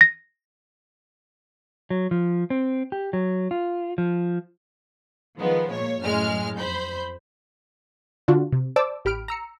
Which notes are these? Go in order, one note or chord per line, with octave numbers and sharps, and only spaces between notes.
A#6
F#3
F3
C4
G4
F#3
F4
F3
D#3 F3 G#3 B3
A#2 C#5
F#2 A2 G#3 F6
F2 C5 B5 G6
D3 D4 F4 F#4
C3
C5 D5 A5 D6 E6
A1 G4 B5 F6 D7
A#5 E6 C#7